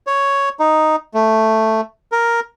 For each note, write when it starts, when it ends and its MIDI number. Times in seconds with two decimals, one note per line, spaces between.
0.07 0.49 73
0.59 0.96 63
1.14 1.81 57
2.12 2.40 70